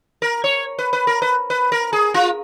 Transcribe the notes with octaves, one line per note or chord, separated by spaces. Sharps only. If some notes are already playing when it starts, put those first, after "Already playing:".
A#4
C#5
B4
B4
A#4
B4
B4
A#4
G#4
F4